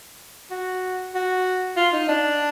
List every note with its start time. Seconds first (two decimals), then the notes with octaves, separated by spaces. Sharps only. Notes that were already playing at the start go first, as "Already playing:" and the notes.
0.51 F#4
1.14 F#4
1.77 F4
1.93 D#4
2.08 D4